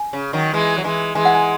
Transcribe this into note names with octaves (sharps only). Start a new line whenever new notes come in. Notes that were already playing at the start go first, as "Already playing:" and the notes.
Already playing: G#5
C#3
D#3 F#3
E3 G#3
F#3
E3 G#3
E3 G#3 G#5
F#5
G#5